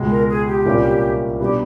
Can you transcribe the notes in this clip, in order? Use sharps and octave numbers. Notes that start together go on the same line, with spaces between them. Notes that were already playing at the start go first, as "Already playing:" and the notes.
Already playing: C#2 B2 G#3
A#4
G#4
G4
C2 A#2 G3 A#3 C#4
B2 G3 B3 D4 G4